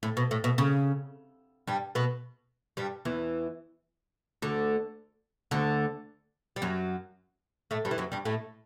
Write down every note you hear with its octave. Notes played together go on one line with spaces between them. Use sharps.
A2
B2
A2
B2
C#3
G2 G3
B2 B3
G2 G3
E2 E3
D2 D3
D2 D3
G3
F#2 F#3
A2 A3
G2 G3
E3
F#2 F#3
G2 G3
A2 A3